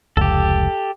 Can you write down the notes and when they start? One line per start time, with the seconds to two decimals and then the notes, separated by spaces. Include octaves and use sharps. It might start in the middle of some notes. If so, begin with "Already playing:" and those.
0.17 F1 C#2 G4 A4